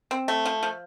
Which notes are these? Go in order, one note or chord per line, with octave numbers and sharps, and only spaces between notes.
C4
A3
F3
F3